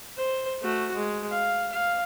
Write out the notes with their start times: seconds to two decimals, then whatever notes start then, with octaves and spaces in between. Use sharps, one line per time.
0.17 C5
0.62 A3 F#4
0.95 G#3
1.30 F5
1.72 F5